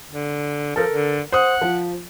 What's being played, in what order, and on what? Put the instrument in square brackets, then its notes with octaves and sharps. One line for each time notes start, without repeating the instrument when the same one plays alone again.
[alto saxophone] D3
[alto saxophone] F3 [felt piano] A4 A#4
[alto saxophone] D3
[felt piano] C5 D#6 [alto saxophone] F#5
[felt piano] F3